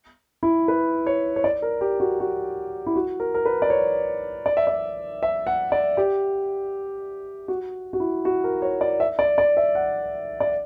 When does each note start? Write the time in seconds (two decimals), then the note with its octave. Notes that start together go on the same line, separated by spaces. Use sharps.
0.43 E4
0.68 B4
1.07 C#5
1.36 C#5
1.44 D5
1.62 A#4
1.81 G4
2.00 F#4
2.20 F#4
2.86 E4
2.96 F#4
3.20 A#4
3.34 A#4
3.45 B4
3.62 D5
3.70 C#5
4.46 D5
4.57 E5
4.67 D5
5.23 E5
5.47 F#5
5.72 D5
5.97 G4
7.48 F#4
7.93 F#4
8.00 E4
8.25 F#4
8.44 A#4
8.62 C#5
8.81 D5
9.00 E5
9.19 D5
9.38 D5
9.57 E5
9.75 F#5
10.40 D5